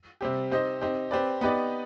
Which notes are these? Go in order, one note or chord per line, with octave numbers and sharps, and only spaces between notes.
C3 G3 C4 G4
C4 D#4 G4 C5 D#5
C4 D#4 G4
C4 G4 B4 D5
B3 D#4 G4 B4 D5